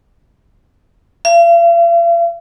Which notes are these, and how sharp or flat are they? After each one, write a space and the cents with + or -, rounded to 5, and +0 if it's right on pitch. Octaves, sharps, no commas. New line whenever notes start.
F5 -45